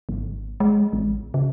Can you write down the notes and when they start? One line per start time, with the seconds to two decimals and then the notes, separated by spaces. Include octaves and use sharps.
0.09 G#1
0.60 G#3
0.93 A1
1.34 C#3